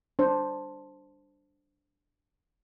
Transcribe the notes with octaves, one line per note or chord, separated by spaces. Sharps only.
D4 C5